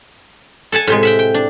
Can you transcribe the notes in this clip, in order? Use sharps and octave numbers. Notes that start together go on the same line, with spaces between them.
A4 F#5 G#5 A5
A2 C3 G#3
E5 F#5 G5
G5
D4